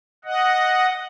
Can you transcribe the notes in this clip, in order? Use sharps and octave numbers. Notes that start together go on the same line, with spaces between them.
D#5 F#5